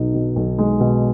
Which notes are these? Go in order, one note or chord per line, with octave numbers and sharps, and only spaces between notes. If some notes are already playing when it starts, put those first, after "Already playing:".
Already playing: B1 B2 D#4
B2
B1
G#3
B2